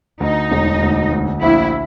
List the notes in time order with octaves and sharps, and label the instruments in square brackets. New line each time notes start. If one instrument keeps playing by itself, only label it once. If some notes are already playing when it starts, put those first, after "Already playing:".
[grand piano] D2 [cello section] D#4
[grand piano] E1
D2
D2
[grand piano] A#1 [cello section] E4